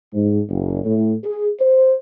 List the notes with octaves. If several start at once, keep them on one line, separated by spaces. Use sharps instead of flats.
G#2
F#1
A2
G#4
C5